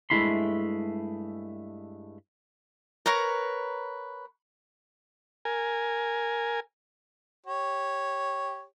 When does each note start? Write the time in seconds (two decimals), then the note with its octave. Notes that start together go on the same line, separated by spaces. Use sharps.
0.10 G2 G#3 A3 E4 B5 C6
3.06 A#4 B4 C#5 A#5
5.45 A#4 G#5
7.46 G4 C#5